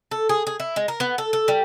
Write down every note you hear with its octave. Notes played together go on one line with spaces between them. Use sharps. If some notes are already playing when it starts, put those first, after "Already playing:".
A4
G#4
G#4
E4
G#3
A#4
B3
A4
A4
G3